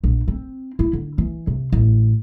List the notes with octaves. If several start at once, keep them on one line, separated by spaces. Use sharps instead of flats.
A#1
C4
E4
D3
E3
C3
A1